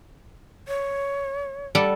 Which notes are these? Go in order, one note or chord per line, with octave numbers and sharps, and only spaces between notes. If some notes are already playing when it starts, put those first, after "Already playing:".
C#5
G3 A4 F#5